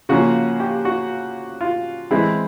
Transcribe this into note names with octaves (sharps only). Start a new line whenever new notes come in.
C#3 F3 A#3 C#4 F#4
G4
F#4
F4
E3 G#3 C4 E4